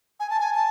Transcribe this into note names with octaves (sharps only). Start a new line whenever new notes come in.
G#5
A5
G#5
A5